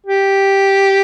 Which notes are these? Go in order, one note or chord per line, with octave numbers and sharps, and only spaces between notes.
G4